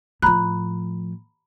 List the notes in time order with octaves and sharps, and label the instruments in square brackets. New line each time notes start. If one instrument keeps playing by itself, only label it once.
[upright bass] A2 F3 [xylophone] A#5 B5 F#6